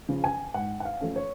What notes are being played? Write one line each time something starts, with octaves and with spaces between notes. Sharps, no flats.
C#3 F3
G#5
G#2 F#5
F#5
F5
F3 A3 C#4
C#5